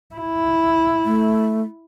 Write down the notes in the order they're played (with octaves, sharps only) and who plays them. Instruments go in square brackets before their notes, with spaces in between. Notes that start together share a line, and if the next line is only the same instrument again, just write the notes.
[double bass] E4
[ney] A3